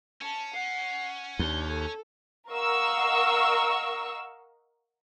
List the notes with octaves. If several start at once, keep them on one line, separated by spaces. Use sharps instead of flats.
C#4 A5
F#5 C7
D#2 D4 G7
A4 G#6
A#4 D#5 F5 F#5 C#6 E6